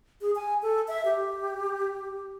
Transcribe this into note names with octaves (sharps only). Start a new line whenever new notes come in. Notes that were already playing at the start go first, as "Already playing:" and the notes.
G#4
G#5
A4
E5
G4